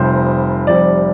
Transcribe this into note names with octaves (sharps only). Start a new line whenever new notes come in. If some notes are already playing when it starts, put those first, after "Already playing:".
Already playing: F1 F2 C3 G3 C5
F1 F2 C3 G3 D5